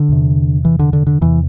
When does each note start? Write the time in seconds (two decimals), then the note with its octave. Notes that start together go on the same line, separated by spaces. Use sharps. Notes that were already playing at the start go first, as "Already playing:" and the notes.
Already playing: D3
0.09 E2 C3
0.65 E3
0.79 D3
0.93 D3
1.07 D3
1.21 E2 C3 E3